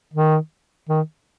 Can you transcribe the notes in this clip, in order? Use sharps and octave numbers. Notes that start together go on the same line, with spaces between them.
D#3
D#3